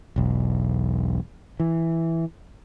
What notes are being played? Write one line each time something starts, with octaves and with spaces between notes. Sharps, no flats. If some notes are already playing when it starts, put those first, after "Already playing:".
E1 B1
E3